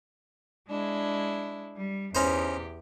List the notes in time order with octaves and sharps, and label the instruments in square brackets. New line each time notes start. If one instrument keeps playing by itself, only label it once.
[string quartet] G#3 D4 E4
G3
[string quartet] E2 G4 [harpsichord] C#4 D#4 C5